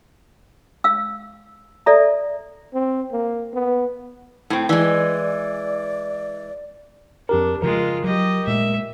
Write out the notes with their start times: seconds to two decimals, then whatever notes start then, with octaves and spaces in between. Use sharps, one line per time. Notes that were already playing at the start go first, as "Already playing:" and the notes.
0.84 F5 E6
1.86 A4 D5 E5 A#5
2.74 C4
3.12 A#3
3.54 B3
4.50 A2 C4
4.69 E3 G#3 D5
7.29 F2 D4 G4 A#4
7.62 C#3 F3 G#3 F4 A#4
8.04 F#3 G4 D#5
8.47 A#2 G#3 A3 E5